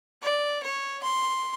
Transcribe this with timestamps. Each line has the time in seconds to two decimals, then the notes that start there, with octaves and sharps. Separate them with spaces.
0.22 D5
0.63 C#5
1.03 C6